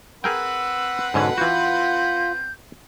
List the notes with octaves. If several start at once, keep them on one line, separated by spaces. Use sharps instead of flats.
C4 G#4 A#4 B4 F#5 G5 E6
G#2 B2 D3 C#4 A4
E3 F4 F#4 G6